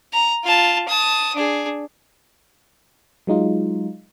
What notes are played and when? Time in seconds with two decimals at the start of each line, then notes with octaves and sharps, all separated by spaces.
0.13 A#5
0.44 F4 A5
0.88 A5 D#6
1.35 D4 G#4
3.27 F#3 G#3 D#4 F4